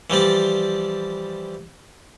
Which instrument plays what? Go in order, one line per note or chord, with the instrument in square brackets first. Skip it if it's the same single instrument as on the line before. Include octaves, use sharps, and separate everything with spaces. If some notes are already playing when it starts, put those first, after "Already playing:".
[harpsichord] E3 F3 G3 D5